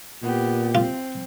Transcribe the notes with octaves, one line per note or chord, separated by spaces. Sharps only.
A#2 B3 G4
C4 F4